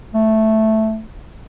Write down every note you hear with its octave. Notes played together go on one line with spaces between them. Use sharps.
A3